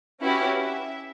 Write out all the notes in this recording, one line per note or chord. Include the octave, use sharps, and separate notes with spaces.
C#4 E4 F#4 G4 B4
E5